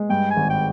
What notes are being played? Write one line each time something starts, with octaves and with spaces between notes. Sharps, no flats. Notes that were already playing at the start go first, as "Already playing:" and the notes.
Already playing: G#3
G2 G5
G#5
G#1
G5